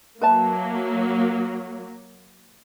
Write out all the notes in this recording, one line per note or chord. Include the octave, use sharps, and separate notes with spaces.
F#3 A#3 B4 E5 A5